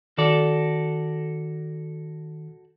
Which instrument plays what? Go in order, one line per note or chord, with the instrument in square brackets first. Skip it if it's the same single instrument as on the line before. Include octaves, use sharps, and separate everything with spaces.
[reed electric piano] D#3 [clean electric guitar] F#4 A4 D5